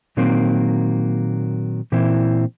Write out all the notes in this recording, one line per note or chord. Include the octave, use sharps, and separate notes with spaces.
A#2 D#3 F#3 A#3 C4
A#2 E3 C4 E4